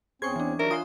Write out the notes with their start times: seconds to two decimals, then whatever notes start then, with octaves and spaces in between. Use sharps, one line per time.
0.22 E2 C4 C#4 G#4 C5 C6 C#6 G#6
0.36 E3 D4
0.59 F#3 D4 D#4 A#4 C#5 E5
0.71 F4 F#5 G#5 C6 D#6